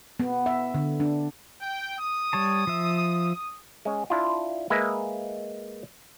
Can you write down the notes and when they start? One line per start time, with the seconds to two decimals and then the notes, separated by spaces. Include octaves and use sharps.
0.20 B3
0.46 E5
0.74 D3
1.00 D4
1.61 G5
1.98 D#6
2.33 G3 C#5 A5
2.67 F3 E5
3.85 G#3 C#4
4.10 D4 E4 F4
4.70 G#3 A#3 B4 E5